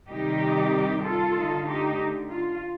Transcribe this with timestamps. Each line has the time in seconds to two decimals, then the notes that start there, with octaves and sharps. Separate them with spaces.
0.10 C3 D#3 G3 D#4 G4
1.04 F4 A4
1.35 D3 A3 D#4
1.67 D#4 G4
2.30 F4